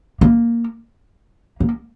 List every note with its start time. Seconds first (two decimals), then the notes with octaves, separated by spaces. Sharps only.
0.21 A#3
1.60 A#3